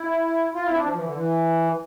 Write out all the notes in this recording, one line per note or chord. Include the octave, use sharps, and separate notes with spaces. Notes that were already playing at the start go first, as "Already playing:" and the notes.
Already playing: E4
F4
E4
C4
D4
F3
E3
D3
E3